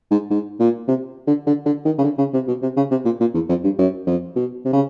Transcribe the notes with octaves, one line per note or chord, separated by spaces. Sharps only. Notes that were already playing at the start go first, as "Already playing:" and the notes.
G#2
G#2
A#2
C3
D3
D3
D3
D#3
C#3
D3
C#3
C3
B2
C3
C#3
C3
A#2
A#2
E2
F2
G2
F#2
F2
B2
C3
C#3